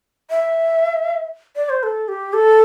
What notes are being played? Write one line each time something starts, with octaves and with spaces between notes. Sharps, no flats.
E5
D5
C5
A4
G4
A4